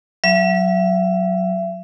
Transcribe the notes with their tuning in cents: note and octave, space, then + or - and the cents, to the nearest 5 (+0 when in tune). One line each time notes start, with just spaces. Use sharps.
F#3 +0 E5 +35